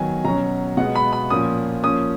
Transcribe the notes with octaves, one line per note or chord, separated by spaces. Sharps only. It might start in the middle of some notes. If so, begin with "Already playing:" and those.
Already playing: D#3 F#3 B3 G#5
B2 F#3 C#4 A#5
B2 G#3 B3 F#5
B5
B5
A#2 F3 A#3 C#4 D#6
F3 A#3 C#4 D#6